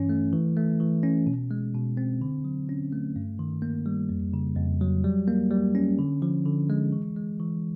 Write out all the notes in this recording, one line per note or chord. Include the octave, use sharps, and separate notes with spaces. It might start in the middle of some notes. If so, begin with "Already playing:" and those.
Already playing: G2 E3 C#4
A3
E3
A3
E3
C#4
B2
G#3
B2
C4
D3
F#3
C#4
A3
G2
D#3
A#3
G3
F2
C#3
F2
F#3
G3
A#3
G3
C#4
D3
F3
D3
G#3
E3
G#3
E3